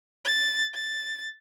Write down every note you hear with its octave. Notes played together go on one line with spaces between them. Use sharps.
A6
A6